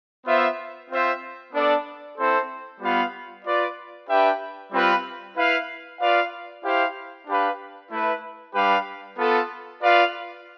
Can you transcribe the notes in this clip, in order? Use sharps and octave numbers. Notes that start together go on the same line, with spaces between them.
B3 F4 C5 E5
C4 F4 C5 E5
B3 D4 A4 D5
C4 E4 A4 C5
G3 B3 F4 B4 F5
F4 B4 D5
D4 G4 B4 E5 G5
G3 C4 F4 B4 F5
E4 B4 F5
F4 B4 D5 F5
E4 G4 C5 F5
D4 G4 B4 F5
A3 E4 B4
G3 D4 G4 B4 F5
B3 F4 A4
F4 B4 D5 F5